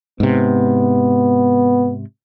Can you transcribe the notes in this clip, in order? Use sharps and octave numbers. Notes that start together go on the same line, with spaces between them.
G#2 C3 B3